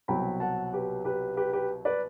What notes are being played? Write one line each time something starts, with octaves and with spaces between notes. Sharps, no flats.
C2 B2 F#3 C4 G5 B5
F#5 A5
G4 B4
G4 B4
G4 B4
G4 B4
B4 D5